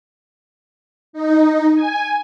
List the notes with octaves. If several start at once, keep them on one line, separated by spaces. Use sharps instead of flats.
D#4
G#5